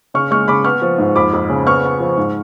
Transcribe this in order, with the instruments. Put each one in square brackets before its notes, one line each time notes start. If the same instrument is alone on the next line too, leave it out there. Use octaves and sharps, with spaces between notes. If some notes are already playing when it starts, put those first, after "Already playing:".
[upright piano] C#3 C#6 F6
G#3 C#6 F6
C#3 B5 D6
B3 C#6 F6
F3
G#2
F2 B5 D6
F2
C#3
B3 C#6 F6
B3
F3
G#2